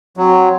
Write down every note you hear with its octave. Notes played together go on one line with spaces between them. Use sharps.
F#3 C4